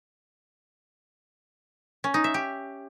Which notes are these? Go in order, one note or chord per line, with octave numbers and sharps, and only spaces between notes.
C#4
D#4
E5
G4